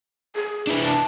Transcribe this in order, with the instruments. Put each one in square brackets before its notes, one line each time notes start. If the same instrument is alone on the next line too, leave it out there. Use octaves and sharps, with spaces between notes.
[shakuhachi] G#4
[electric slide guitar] D4 E4 B4
[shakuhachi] A5